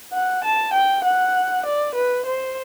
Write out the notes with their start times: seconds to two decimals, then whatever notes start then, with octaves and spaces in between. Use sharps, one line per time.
0.13 F#5
0.44 A5
0.74 G5
1.05 F#5
1.66 D5
1.95 B4
2.26 C5